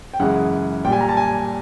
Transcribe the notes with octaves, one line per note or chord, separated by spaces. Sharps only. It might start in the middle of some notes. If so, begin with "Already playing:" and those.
G5
F#2 C#3 E3 G#3 F#5
A#2 G3 G5 G#5
A#5
A5
G#5